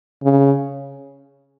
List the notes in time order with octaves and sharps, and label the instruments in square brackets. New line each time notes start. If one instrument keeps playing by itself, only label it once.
[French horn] C#3